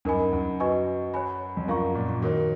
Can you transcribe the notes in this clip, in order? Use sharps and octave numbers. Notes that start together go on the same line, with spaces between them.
F#2 D#4 A#4 D#5 G#5 B5
F#2
F#4 B4 D#5 G#5 C#6
C#5 G#5 B5
F2
F#2 F4 A#4 F5 A#5 C#6
A#2
A#2
D#3 F#4 A#4 C#5